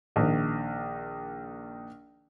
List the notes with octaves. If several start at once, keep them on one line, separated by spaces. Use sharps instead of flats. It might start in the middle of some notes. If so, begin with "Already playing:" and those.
A#1 D#3